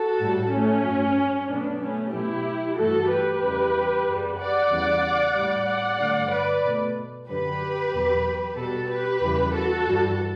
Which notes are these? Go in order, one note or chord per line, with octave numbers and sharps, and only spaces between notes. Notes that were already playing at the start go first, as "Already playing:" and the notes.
Already playing: F#4 A4
A2 G3
A3 C#4
G2 F#3 A3
B2 F#3 A3 B3 D4
A3 C#4
B2 F#3 A3 E4 G4
G2 E3 A3 F#4 A4
G4 B4
E2 C#3 E3 G3
F#2 C#3 G3
D5 F#5
E2 C#3 E3 G3
A2 G3
D5 F#5
G2 D3 F#3 A3
B4 D5
B2 A3
F#2 D3 F#3 G4 B4
E2 B2 F#3
B2 G3 F#4 A4
G4 B4
E2 C#3 E3 G3
F#4 A4
G2 E3 G3